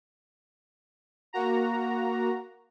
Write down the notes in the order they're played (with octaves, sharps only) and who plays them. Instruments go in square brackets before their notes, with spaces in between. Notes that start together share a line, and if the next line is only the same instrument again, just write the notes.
[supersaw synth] A#3 F#4 A#5